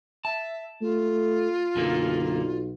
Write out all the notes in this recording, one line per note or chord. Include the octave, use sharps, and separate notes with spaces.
E5 A5
A3 F4
B1 F#2 D3 A#3